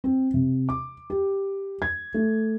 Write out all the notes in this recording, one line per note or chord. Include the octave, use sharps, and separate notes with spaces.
C4
C3
D6
G4
G#6
A3